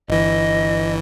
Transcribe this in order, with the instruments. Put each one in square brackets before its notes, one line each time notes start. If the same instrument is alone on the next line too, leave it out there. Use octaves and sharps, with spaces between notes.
[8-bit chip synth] G1 E3 [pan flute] D#5